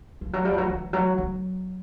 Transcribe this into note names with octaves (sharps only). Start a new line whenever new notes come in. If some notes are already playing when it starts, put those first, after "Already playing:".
F3
F#3
G3
F3
F#3
E3
F#3
F#3